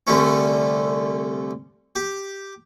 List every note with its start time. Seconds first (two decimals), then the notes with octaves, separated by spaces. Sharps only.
0.07 C2 D3 G3 A3 C#4
1.96 G4